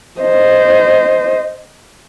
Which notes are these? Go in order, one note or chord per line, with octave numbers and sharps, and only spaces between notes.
C5 D#5